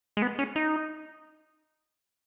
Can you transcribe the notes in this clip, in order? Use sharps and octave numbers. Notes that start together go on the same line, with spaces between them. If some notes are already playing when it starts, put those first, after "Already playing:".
G#3
B3
C#4
D#4